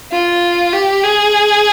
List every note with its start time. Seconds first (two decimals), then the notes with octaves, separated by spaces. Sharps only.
0.12 F4
0.73 G4
1.04 G#4